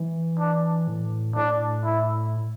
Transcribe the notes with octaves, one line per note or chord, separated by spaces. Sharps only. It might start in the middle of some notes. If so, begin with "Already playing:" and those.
Already playing: E3
D4
A2
A2 D4
E4